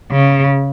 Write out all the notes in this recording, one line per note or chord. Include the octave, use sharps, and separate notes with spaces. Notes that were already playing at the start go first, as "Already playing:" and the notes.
C#3